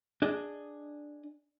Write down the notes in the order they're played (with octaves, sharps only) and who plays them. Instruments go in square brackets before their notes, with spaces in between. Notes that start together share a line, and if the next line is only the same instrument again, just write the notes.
[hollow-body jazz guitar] D4 G#4 D#5